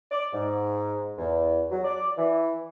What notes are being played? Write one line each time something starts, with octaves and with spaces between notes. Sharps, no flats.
D5
G#2
E2
F#3
D5
E3